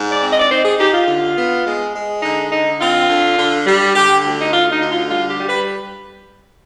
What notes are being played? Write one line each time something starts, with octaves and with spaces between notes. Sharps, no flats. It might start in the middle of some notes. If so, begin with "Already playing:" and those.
Already playing: G#2
D5
C4
D#5
D5
D#4 C5
G#4
D#4 G4
F4
D3
B3
G#3
G#3
D3 D#4
D3 D#4
C4 F4
D3
D3
G3
D3 G4
D2
D#4
D2 F4
D#4
D3
F4
G3 F4
G4
G3
B4